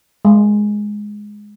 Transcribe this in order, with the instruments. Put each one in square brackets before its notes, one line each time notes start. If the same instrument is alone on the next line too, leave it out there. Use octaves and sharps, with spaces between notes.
[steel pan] G#3